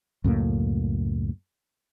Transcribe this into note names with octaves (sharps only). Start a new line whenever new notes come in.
C#2 F#2 A2 A#3